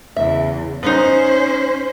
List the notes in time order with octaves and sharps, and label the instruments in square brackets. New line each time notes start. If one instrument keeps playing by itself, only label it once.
[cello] E2 C#3 [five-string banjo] E5
[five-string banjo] B3 D#4 [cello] C#4 C5